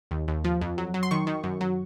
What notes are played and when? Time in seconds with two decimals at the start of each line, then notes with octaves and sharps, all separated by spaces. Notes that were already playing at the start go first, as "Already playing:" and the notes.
0.11 D#2
0.28 D#2
0.44 F3
0.61 F2
0.78 F#3
0.94 F#3
1.03 C6
1.11 D#3 C#6
1.27 D#3
1.44 F#2
1.61 F#3